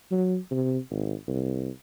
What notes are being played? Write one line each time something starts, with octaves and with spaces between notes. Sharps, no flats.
F#3
C3
G#1
C2